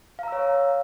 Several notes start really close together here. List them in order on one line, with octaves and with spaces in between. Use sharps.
F5 A#5 E6 C#5